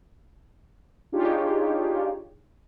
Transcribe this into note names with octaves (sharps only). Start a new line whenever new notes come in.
D4 D#4 F4 G4 G#4 C#5